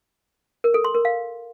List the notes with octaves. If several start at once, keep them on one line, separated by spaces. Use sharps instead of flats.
A#4
A4
C6
A#4
F5